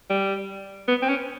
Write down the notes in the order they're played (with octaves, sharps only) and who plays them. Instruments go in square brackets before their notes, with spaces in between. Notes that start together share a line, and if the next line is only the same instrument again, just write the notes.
[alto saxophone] G3
B3
C4
C#4